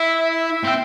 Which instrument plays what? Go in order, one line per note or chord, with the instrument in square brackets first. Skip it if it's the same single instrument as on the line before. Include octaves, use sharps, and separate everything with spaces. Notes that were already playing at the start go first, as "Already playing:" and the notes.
Already playing: [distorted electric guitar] E4 [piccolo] E5
[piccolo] E5
[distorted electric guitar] C4 [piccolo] G5